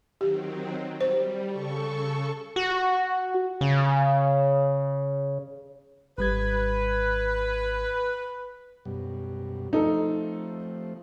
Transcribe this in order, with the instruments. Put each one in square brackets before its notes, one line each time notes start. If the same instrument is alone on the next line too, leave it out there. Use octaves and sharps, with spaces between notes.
[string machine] D#3 F#3 C4 [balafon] G4
[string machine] G3 [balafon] C5
[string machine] C#3 A4 C#6
[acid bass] F#4
C#3
[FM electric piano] G#1 G3 G#6 [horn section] B4
[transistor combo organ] F#2 B2 G3
[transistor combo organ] F3 A3 C4 [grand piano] D#4 A4